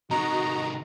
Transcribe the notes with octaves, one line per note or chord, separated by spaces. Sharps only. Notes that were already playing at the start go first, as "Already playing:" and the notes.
C3 D#3 F#4 D#5 A#5